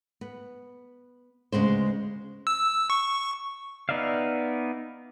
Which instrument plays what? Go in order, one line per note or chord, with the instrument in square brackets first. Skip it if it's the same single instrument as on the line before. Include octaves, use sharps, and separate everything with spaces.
[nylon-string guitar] B3
D2 C#3 G#3 B3 C5
[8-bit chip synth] E6
C#6
[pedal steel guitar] B3 D#4 D5 E5 F5